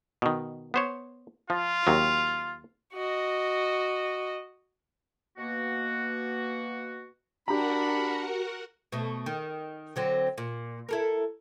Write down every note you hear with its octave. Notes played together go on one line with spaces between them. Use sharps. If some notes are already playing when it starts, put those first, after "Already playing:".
B2 D#3
B3 C5 C#5
F3 F4
D#2 F#3
F#4 D#5
B2 A#3 F#4
D4 F#4 G4 A#4 F#5 A#5 B5
B2 A3
D#3
D3 F#3 C4
A#2
E4 A4 A#4